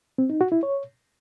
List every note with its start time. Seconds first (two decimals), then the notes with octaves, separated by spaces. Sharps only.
0.18 C4
0.30 D#4
0.41 F#4
0.52 E4
0.63 C#5